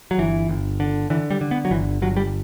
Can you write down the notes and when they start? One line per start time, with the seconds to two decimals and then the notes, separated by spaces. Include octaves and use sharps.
0.11 F#3
0.18 G1 E3
0.49 G1
0.80 D3
1.10 D3 E3
1.31 G3
1.41 D3
1.51 B3
1.65 F#3
1.71 G1 E3
2.02 G1 F#3
2.17 G3